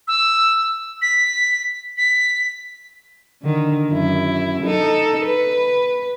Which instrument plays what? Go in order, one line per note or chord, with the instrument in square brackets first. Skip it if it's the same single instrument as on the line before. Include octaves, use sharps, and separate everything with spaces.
[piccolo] E6
B6
B6
[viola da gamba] D3 D#3
F#2 E4
D#4 A4
B4